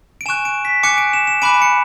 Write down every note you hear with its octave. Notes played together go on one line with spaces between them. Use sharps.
D7
G#5 C#6 F#6 E7
D7
B6
G#5 D6 F#6 C#7
D7
E7
E7
G#5 B5 D6 F#6 D7
C#7